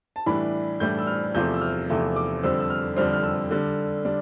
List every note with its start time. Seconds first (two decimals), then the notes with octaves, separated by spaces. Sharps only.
0.16 A5
0.26 A2 E3 G3 D4 B5
0.80 A2 E3 G3 D4 G6
0.98 E6
1.07 F6
1.35 E2 C3 F3 A3 G6
1.54 E6
1.61 F6
1.89 E2 C3 F3 A3
2.16 D6
2.43 F2 D3 G3 C4 E6
2.60 E6
2.70 F6
2.96 F2 D3 G3 C4 F6
3.13 F6
3.24 E6
3.51 D3 G3 D4
4.05 D3 G3 D4